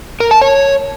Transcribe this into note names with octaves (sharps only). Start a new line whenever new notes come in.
A#4
A5
C#5